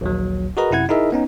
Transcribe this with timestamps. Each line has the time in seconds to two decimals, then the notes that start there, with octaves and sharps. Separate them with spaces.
0.01 A#1 D#2 F#3
0.57 F#4 G#4 A#4 B4 D#5 A#5
0.71 F#2 C3 E4 F#5 G#6
0.89 D#4 E4 G#4 A#4 D#5 E5
1.12 B3 C#4 D#4